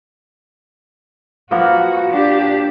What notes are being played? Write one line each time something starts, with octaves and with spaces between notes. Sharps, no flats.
F3 A#3 B3 F#4
D4 G4